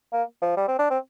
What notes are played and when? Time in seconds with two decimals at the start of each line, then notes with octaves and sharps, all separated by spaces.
0.13 A#3
0.42 F3
0.57 G3
0.68 C4
0.79 D4
0.90 C4